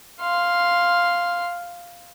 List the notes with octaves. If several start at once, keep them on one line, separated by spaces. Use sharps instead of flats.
F5 C6